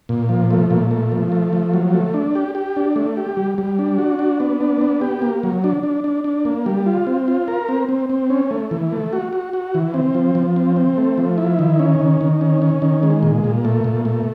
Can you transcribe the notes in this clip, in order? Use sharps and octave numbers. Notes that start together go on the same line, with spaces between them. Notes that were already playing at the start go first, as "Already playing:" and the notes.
A#2
F3
A3
A#2
A3
F3
A3
F3
F#3
A3
D4
G4
G4
D4
A3
G4
G3
G3
D4
F#4
D4
B3
D4
B3
G4
A#3
F#3
D4
D4
D4
D4
A#3
G3
F4
C4
F4
A#4
C4
C4
C4
C#4
A3
E3
A3
F#4
F#4
F#4
E3
C4
F3
F3
C4
C4
A3
F3
E4
D#3
C#4
D#3
D#3
C#4
C#4
D#3
G#3
A#2
A#2
A3
A#2
A3